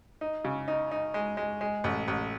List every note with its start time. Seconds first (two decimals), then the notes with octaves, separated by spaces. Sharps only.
0.21 D#4
0.45 C#3
0.68 D#4
0.91 D#4
1.14 G#3
1.37 G#3
1.61 G#3
1.84 A1
2.08 A1